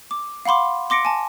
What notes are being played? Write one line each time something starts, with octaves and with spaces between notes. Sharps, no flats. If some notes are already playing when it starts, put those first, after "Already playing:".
D6
F5 F#5 B5 C6 D6
C6 D6 A#6 C#7 D7
G#5 A5